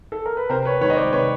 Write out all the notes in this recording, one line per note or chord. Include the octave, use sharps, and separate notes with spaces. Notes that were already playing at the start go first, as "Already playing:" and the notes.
A4
A#4
B4
C3 A#4 C5
B4 C#5
D#3 G#3 B4 C#5
D#5
C5 D5
C3 B4 C#5